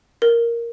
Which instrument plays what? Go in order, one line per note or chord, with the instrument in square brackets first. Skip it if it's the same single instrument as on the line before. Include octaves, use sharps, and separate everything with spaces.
[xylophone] A#4